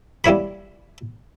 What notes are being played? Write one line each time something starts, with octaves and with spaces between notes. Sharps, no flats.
G3 A#3 E4 C#5 B5